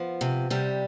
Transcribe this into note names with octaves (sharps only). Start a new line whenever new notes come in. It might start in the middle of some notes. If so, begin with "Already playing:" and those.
Already playing: F3 B3
C3
C3 G3